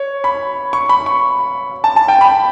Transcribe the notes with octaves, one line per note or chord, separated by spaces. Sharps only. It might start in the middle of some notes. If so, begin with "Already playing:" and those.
Already playing: C#5
B5
C#6
B5
C#6
A5
A5
G5
B5